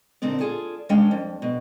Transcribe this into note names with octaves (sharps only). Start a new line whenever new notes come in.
A#2 D3 C4 D#4 D5
F4 G#4 A4 D5
D#2 G#3 C#4 D4 F5 G5
F2
B2